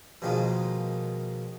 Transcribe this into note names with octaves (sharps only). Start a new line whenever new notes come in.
B2 D#3 F3 G#3 A#3 F4